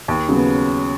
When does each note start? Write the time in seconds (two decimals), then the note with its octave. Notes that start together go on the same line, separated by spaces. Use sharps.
0.08 D#2
0.29 C#3 F#3 B3